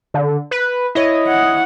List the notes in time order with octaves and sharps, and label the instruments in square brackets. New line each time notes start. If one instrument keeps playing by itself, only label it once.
[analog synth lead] D3
B4
[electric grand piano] E4 C#5 [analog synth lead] D#5
[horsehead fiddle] F#5